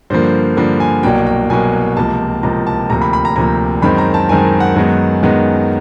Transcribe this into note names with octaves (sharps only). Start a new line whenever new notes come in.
G2 D3 F3 A#3 C5
G2 D3 F3 A#3
G#5
C2 B2 F#3 A#3 G5
G5
C2 B2 F#3 A#3 G#5
C#2 C3 F3 A#3 A5
C#2 C3 F3 A#3 A#5
A5
D2 C3 F3 A#3 A#5
B5
B5
A#5
D2 C3 F3 A#3 A#5
F#2 D#3 G#3 C4 B5
A#5
A5
F#2 D#3 G#3 C4 G#5
F#5
F#2 D#3 G#3 B3
F#2 D#3 G#3 B3